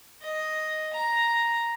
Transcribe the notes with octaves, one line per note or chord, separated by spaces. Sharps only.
D#5
A#5